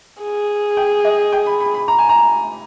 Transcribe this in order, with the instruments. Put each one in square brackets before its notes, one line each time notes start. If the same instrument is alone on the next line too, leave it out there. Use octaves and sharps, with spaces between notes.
[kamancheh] G#4
[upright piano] G5
D#5
G5
B5
B5
B5
A#5
G#5
A#5